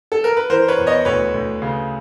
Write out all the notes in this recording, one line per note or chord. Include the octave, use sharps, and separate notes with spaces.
A4
A#4
B4
E3 A#4 C5
B4 C#5
E2
C#5 D#5
D2 B4 C#5
D2
C#3